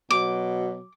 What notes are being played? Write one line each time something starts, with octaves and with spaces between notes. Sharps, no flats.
B2 F#3 D6